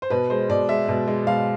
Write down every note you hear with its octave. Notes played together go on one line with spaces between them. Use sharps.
C5
B2 B4
G#3 C5
B2 D5
G#3 E5
B2
G#3
B2 F5